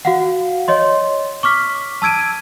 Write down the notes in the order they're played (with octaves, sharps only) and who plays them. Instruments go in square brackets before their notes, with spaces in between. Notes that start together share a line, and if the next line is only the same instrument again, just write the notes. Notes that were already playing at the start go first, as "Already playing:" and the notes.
[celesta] F#4 F5 F#5
C#5 D#5 C6
C#6 D6 F6 B6
A5 E6 G#6 D7 D#7